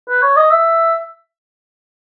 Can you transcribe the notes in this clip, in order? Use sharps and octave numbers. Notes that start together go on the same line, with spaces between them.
B4
C#5
D#5
E5